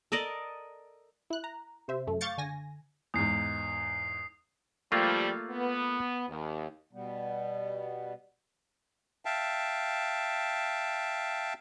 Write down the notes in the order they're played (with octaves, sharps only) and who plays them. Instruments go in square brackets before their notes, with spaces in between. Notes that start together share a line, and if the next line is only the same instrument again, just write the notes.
[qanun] A4 A#4 D5 D#5
[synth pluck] E4 F#6
A#5
C3 C5 E5
F#2 A3
F5 C#6 D6 G6 A6 C#7
D3 G#5 A#6
[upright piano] E2 G#2 [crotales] D#6 C7
[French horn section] F3 G3 [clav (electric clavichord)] A3 A#3 F4
[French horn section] B3
D#2
[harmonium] B2 G3 B3
[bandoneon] E5 F5 G5 A5